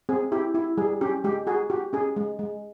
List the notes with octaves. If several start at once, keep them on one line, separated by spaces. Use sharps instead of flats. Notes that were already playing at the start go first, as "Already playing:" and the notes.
C4 G#4
E4 G4
E4
G3 G#4
C#4 G4
G#3 G4
F#4 G#4
F#4 G4
C#4 G#4
G#3
G#3